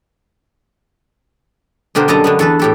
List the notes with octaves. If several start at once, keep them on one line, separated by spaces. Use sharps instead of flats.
B2 D3 G4 A#4 C5
F#2 G3 A4 D#5 A5 A#5
D3 A3 B3
E2 A4 B4
A2 G4 A4